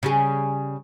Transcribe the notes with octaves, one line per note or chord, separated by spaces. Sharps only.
C#3 G3 G#4